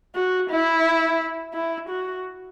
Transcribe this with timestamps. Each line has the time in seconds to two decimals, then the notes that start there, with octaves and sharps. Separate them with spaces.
0.15 F#4
0.50 E4
1.53 E4
1.88 F#4